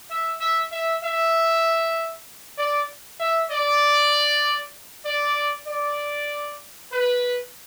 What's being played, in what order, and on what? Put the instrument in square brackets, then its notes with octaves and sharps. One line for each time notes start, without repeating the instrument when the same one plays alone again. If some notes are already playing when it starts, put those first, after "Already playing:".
[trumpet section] E5
E5
E5
E5
D5
E5
D5
D5
D5
B4